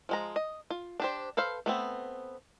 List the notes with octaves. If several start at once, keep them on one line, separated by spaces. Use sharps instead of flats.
F3 G#3 A#5
D#5
F4
D4 G4 C5
A4 B4 C5 F5
A3 B3 C4